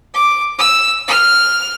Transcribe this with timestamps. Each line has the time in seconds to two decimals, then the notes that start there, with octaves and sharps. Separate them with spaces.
0.14 D6
0.59 E6
1.08 F6